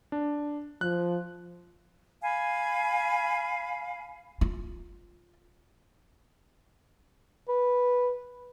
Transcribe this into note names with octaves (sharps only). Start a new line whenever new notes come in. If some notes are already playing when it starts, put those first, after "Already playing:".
D4
F3 F#6
F5 G#5 B5
F4
B4